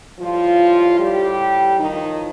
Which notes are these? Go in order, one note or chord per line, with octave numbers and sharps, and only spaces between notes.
A2 F3 G3 F4
G3 G4
A2 D#3 F3 D#4